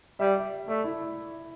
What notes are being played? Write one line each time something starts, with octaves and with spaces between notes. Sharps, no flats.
G3 E5
E5
A3 D5
E4